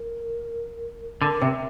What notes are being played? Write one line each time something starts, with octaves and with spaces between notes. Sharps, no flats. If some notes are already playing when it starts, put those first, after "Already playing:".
Already playing: A#4
D3 A#4
C3 E5